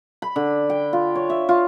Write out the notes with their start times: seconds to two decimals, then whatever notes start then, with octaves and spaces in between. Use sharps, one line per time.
0.22 B5
0.36 D3
0.70 G5
0.93 F4
1.15 C#5
1.30 E5
1.49 F4